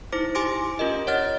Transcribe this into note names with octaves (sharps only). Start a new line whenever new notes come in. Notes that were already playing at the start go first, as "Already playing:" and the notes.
D#4 E4 C5 D6
G4 G#5 C6 D6 A#6 D7
C#4 F4 A#4 D#5
C#5 D#5 F#5 F6 A6